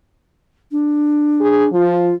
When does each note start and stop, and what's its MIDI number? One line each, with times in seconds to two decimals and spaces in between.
0.71 1.71 62
1.41 1.66 68
1.73 2.12 53
1.73 2.14 65